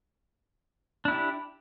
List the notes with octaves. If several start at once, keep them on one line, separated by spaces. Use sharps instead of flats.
D4 E4 G4